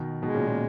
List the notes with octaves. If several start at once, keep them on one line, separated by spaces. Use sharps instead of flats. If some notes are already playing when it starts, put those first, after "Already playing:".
Already playing: B2 D#3
B2 D#3 G#3
A#2 C#3
A#2 C#3